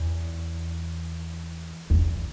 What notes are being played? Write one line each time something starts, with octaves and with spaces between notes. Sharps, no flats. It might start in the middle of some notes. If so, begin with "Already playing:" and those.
Already playing: E2
E2